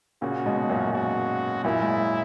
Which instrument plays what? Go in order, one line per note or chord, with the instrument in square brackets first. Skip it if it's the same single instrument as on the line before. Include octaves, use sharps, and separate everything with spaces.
[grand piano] A#2 C#3 [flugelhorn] F#4
[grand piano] G#2 B2
F#2 A#2
[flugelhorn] F#4
[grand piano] F#2 A#2 [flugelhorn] E4
[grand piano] G#2